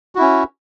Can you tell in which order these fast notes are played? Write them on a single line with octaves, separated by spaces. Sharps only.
F#4 E4 C#4